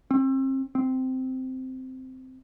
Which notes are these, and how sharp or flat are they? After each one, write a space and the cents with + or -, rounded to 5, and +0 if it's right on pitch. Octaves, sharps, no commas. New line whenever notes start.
C4 +35
C4 -10